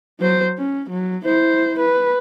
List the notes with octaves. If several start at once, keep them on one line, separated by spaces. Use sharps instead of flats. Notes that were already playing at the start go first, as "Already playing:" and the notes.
F#3 C5
C#4
F#3
E4 C5
B4